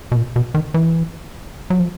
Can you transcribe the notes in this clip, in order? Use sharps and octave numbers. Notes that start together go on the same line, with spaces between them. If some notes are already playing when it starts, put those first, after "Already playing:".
B2
A#2
B2
D#3
E3
F#3
F3